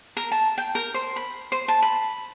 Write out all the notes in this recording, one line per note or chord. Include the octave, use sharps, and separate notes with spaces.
A#4
A5
G5
A#4
C5
B5
C5
A5
B5